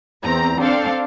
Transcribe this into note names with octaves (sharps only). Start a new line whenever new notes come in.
E2 C4 A#5
C4 D4 A4 F5